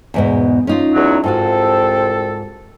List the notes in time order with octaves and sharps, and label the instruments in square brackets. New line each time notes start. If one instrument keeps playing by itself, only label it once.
[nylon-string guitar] E2 G#2 B2
C#4 D#4 F4
[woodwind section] E2 F#3
[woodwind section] C2 C4 A4 [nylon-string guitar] G#2 F4 F#4